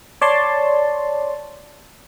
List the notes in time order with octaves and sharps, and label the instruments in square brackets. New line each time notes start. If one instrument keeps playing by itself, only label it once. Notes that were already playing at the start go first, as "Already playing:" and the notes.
[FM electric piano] C#5 D5 A5 C6